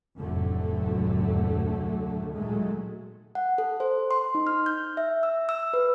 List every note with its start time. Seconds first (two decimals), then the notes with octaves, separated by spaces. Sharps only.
0.19 F1 D2 A2 D3 F#3 A3
2.34 A#2 D#3 F#3 G#3 A3
3.35 F#5
3.58 A4
3.80 C5
4.11 C6
4.35 D#4
4.47 F6
4.66 G6
4.97 E5
5.23 E6
5.49 E6
5.73 B4